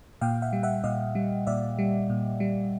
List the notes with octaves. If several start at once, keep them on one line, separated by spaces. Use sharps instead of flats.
A#2 F5 G5
E5 F#5
G3
E5 F#5
A#2 D#5 F5
G3
A#2 D5 E5
G3
A#2
G3